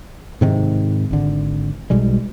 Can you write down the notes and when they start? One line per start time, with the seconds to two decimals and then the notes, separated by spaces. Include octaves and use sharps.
0.41 G#2 C3 D#3
1.11 G#1 D3
1.90 B1 B2 G3 G#3